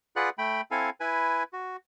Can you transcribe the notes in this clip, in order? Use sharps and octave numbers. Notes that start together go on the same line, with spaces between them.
F4 G#4 B4 D5 F#5 F#6
A3 G5 B5
C4 E4 A4 F5 G#5
E4 B4 G#5
F#4